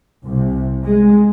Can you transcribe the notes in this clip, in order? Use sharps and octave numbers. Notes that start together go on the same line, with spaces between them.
C2 C3
G#3